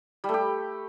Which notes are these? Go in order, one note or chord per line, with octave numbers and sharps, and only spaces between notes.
G3
A3
G4